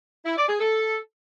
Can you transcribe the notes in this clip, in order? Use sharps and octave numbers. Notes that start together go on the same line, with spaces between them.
E4
D5
G#4
A4